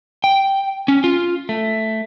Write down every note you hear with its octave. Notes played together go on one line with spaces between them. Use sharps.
G5
C#4
F4
A3